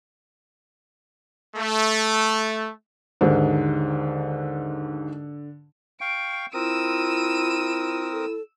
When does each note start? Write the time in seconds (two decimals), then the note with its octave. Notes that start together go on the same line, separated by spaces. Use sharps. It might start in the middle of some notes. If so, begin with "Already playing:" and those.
1.56 A3
3.21 D#2 G#2 D3
6.01 F5 G5 C#6 D7
6.54 C4 E4 F4 A#4 D#6 E6 D#7
8.12 A4